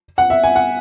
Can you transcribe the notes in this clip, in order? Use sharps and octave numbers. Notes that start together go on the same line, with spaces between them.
F#5
E5
G#5
F#5